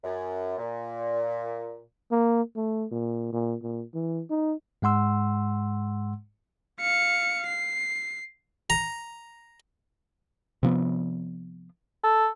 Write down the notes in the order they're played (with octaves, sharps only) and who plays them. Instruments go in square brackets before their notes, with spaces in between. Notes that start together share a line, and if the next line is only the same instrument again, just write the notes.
[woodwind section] F#2
A#2
[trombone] A#3
A3
A#2
A#2
A#2
E3
D#4
[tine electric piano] G#2 G#3 F#5 C6 E6
[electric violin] F5 C#7
C7
[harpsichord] A#5
[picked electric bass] C3 F3 B3
[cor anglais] A4